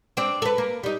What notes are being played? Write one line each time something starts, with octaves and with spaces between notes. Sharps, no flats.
C4 D4
A4 B4
A#3
G3 D#4